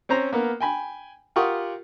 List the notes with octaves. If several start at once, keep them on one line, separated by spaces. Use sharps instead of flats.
C4 C#4 C5 A#5
A#3 B3 A#4
G5 G#5 B5
F4 G4 A#4 F#5 C#6 D#6